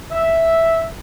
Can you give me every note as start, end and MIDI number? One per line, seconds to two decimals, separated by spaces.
0.12 0.83 76